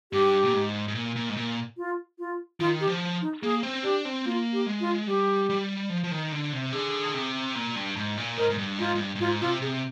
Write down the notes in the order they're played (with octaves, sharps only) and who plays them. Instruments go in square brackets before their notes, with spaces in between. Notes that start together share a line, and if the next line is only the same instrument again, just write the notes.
[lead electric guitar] G2 [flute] G4
[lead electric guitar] A#2
G#2
G#2
A#2
A#2
G#2
A#2
[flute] F4
F4
[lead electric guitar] D#3 [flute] F4
[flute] G4
[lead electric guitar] F3
[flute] D#4
[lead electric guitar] A#3 [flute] G#4
[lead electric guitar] C4
[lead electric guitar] D4 [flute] G4
[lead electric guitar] C4
[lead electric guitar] A#3 [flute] F4
[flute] G4
[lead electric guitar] G#3
[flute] F4
[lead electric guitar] G3 [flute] G4
[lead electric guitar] G3
F3
F3
D#3
D3
C3
[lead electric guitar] D3 [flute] G#4
[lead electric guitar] C3
A#2
G2
G#2
A#2
[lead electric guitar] G#2 [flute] A#4
[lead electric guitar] G#2
G2
[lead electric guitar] G#2 [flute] F4
[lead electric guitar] G#2
G2
G2
[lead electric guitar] G#2 [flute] F4
[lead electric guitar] C3 [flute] F4
[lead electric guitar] C3 [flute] G#4